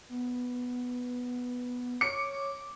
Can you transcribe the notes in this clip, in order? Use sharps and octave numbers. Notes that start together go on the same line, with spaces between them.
B3
C#5 D6 C#7